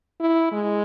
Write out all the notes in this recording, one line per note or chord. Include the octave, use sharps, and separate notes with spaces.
E4
G#3